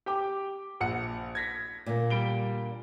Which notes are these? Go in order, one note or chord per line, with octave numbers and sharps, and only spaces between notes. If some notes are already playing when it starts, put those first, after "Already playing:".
G4 G5 D6
A#1 F#5 C#7
G#6 A#6 B6
A#2 D3 A#3
G3 D7 G7